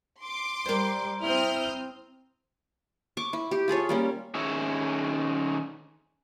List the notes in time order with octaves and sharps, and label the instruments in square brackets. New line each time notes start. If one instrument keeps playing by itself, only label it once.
[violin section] C6 D6
[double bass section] G3 [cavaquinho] A#4 C5
[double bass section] C4 [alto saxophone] E4 [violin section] D#6 F6 G6
[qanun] C#6 D6
E4
G4
F4 G#4 A4 C#5
G3 A#3 C#4
[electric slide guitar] D#3 C#4 G#4 C#5 E5